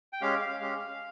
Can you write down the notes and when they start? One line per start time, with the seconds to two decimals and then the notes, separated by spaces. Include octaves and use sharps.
0.13 G5
0.21 G#3 C#4 G4 F5
0.41 F5
0.60 G#3 C#4 G4 F5